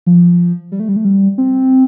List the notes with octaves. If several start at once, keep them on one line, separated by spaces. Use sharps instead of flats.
F3
G3
A3
G3
A3
G3
C4